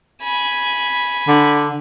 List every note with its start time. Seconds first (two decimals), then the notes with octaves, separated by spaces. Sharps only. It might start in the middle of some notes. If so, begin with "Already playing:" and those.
0.23 G#5 B5
1.28 D3